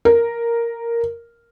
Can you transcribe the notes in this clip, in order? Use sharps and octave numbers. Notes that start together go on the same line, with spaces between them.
A#4